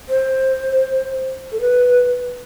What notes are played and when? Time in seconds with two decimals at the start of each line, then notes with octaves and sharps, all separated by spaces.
0.09 C5
1.52 A4
1.61 B4